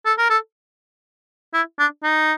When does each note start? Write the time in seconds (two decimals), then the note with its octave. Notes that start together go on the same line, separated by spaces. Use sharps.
0.06 A4
0.18 A#4
0.30 A4
1.54 E4
1.79 D4
2.03 D#4